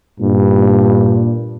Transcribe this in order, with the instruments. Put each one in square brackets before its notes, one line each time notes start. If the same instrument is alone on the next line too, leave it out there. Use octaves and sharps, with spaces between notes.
[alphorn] G2 [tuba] A#2